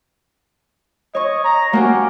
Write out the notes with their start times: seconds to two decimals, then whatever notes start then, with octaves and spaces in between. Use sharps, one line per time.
1.15 C#5 D#5 C#6
1.44 A#5
1.73 A#3 C#4 F#4 G4